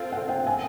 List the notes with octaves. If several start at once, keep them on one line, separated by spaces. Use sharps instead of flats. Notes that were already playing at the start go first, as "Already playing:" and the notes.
Already playing: C4 F4 A4 F5
F#5
G5
G#5